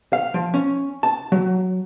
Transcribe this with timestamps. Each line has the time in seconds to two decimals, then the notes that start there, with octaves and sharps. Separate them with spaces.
0.13 F5
0.34 F3
0.54 C#4
1.03 A5
1.32 F#3